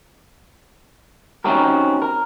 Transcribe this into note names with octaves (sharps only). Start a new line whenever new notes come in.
C4 C#4 D#4 F#4 G4 A#4
A#4